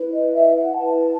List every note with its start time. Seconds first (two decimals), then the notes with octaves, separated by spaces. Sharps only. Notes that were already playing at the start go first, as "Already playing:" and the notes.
Already playing: E4 B4
0.13 D#5
0.33 E5
0.54 F#5
0.75 E4 B4 A5